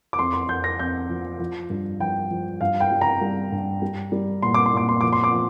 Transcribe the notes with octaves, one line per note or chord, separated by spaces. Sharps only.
D6
F2 C6
C6
F2 G6
A#6
F2 G6
F3
F3
G2
F3 G5
F3
G2 F5
G5
G3
A#5
G3
G2
G3
G3
A#2 C6
D6
C6
A#2 D6
C6
F3 D6
C6
D6
F3